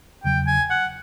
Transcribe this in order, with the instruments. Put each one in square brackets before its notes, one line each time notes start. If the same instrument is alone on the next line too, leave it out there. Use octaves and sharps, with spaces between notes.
[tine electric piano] E2 C#3 F#3 [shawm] G5
[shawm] G#5
F#5